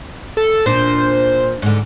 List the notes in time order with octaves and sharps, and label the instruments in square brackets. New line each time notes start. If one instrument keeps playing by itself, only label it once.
[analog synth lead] A4
[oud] A#2 D4 [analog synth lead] C5
[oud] G#2 D3